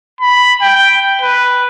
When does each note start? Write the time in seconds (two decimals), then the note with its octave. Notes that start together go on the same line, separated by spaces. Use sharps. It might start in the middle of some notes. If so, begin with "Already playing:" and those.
0.21 B5
0.62 G5
1.22 B4